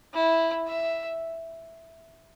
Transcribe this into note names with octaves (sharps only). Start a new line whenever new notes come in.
E4
E5